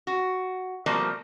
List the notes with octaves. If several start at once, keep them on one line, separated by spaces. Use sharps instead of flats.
F#4
B2 F3 G3 A3 A#3 C4